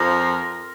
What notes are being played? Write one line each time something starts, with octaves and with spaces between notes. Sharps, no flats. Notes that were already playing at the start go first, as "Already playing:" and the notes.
Already playing: F2 F3 A#4